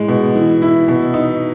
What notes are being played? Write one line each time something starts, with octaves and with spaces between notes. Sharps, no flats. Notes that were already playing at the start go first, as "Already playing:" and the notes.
Already playing: A2 G#3
B2
E3
E4
B2
D#4